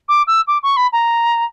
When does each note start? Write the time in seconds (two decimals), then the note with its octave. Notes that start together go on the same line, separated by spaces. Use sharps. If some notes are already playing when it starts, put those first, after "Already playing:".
0.08 D6
0.27 E6
0.47 D6
0.63 C#6
0.77 B5
0.92 A#5